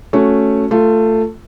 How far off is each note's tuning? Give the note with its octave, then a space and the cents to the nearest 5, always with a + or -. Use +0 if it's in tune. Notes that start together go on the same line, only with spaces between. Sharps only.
A3 +0 C#4 +0 F#4 +0
A3 +15 F4 +0